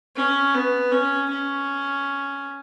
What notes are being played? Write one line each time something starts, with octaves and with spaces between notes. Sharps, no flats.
C#4
B3
C#4
C#4